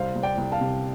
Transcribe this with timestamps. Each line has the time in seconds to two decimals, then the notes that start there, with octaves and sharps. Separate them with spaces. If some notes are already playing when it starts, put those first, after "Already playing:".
Already playing: C2 C5 F5
0.16 C2
0.23 D5 G5
0.38 C2
0.52 F5 A5
0.60 C3